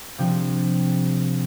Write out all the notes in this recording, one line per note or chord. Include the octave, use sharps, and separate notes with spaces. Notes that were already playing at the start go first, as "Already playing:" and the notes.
C3 F3 G3 C4 D4